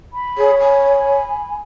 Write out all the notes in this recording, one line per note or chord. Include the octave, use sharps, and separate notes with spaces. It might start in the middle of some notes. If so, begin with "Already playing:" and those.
B5
G#4 C#5
G#5 B5